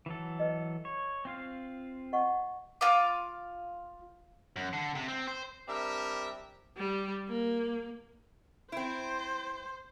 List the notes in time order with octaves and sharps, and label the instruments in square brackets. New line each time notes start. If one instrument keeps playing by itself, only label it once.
[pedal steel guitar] E3 F#3 A4
[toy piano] B4 D#5
[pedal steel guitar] C#5
C4 F4 F5
[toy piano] D#5 F#5 C#6
[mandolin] F4 F5 D6
[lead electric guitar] F#2
D3
C3
C4
C5
[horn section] G3 C4 D4 A#4 E5
[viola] G3
A#3
[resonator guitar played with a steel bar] C4 E4 [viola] C5